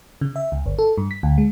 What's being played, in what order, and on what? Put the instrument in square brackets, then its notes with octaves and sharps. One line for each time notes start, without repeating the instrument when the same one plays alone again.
[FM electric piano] C#3
E5
C#2
G1
A4
G2
B6
D2
G#3